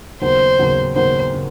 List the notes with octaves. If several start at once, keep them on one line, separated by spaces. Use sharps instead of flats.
D#2 C#3 F#3 B3 C5
D#2 C#3 F#3 B3
D#2 C#3 F#3 B3 C5
C#3